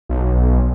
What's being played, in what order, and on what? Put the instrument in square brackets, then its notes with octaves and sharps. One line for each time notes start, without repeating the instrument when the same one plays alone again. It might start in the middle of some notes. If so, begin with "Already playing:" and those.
[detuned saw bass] B1